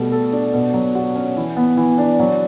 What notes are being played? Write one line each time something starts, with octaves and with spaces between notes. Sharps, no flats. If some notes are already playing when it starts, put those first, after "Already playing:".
Already playing: B2 G3 A3
A4
D4
B2
F#3
F#4
C#4
E3
B3
E3
D4
F#3